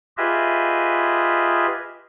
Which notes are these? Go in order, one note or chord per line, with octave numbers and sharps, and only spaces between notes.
F4 G4 G#4 B4 D#5 E5